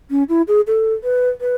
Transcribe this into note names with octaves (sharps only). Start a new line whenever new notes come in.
C#4
E4
G#4
A4
B4
B4